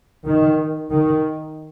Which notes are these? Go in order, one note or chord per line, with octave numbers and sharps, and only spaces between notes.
D#3
D#3